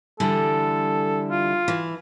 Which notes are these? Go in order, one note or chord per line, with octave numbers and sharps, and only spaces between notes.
D3 E3 G3 A4
F4
E3